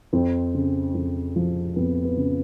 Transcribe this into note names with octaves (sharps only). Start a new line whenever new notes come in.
F2 C4
C#3
F2
F3
F2 B3
B3
C#3